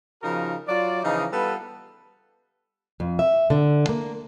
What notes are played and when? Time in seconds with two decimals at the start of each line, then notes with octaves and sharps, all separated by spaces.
0.23 C#3 F3 D#4 F#4 A#4
0.68 F#3 F4 D5
1.03 C#3 E3 F3 D#4
1.33 G3 B3 F4 A4 B4
3.00 F2
3.19 E5
3.50 D3
3.89 A#3